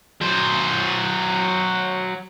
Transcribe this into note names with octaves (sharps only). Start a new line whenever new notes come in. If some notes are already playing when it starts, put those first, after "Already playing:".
F#3 C5